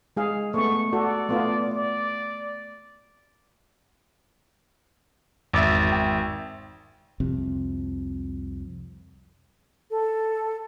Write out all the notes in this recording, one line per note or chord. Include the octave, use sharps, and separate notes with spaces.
G#3 G#4 F5
A3 B3 C#6
F#4 A4 D5
A3 B3 F4
D5
G#1 E2 E5 D6 A6
G5
C2 F2 C3
A4